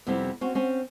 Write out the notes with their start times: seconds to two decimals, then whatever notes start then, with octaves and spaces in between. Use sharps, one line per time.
0.07 F2 C3 G3 B3 C4 E4
0.41 C4 C#4 F#4
0.55 C4 C#4